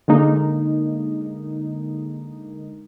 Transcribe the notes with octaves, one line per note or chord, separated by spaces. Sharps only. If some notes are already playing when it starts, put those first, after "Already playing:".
D3 G#3 A#3 D#4